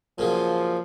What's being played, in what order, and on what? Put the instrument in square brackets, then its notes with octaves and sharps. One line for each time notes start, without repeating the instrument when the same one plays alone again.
[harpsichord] A#2 C#3 F#3 [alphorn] F3